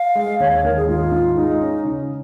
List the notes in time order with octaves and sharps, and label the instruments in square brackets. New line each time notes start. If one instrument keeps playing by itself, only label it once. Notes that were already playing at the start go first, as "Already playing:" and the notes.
Already playing: [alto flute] F5
[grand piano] G#3
[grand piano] D#2 [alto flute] C#5
[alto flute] C#5
[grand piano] D#2 [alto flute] A#4
[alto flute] G#4
[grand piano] G#2 [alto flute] F4
[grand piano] G#2
[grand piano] G#3 [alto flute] D#4
[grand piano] C#4
C#3